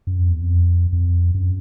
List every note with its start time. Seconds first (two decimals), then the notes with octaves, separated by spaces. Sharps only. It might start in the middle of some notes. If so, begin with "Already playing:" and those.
0.07 F#2
0.18 F2
0.30 E2
0.42 F2
0.93 F2
1.35 F#2